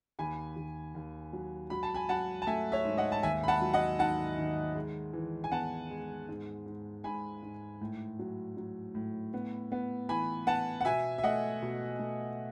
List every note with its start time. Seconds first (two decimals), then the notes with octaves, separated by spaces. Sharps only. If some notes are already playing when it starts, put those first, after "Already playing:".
0.19 D#2 G#5 B5
0.56 D#2
0.95 D#2
1.33 F#3
1.70 F#3 B5
1.83 A5
1.94 G#5 B5
2.09 F#3 F#5 A5
2.42 A5
2.47 A3 E5 G#5
2.72 C#5 E5
2.85 G#2
2.98 D#5 F#5
3.12 A5
3.23 D#2 E5 G#5
3.44 B5
3.48 F#5 A5
3.62 F#3
3.74 D#5 F#5
3.99 D#3 F#5 A5
4.38 D#3
4.75 G#3
5.13 E3
5.44 G#5
5.52 B3 F#5 A5
5.90 G#3
6.28 G#2
6.66 G#2
7.04 G#2 G#5 B5
7.43 G#2
7.81 A2
8.19 F#3
8.57 F#3
8.95 A2
9.34 B3
9.72 B3
10.09 E3 G#5 B5
10.47 B3 F#5 A5
10.81 F#5
10.85 B2 E5 G#5
11.18 E5
11.24 A3 D#5 F#5
11.62 B2
11.99 A3